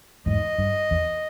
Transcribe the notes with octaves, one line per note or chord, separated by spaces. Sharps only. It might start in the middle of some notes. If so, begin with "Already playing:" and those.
E2 G#2 D#5
G2
E2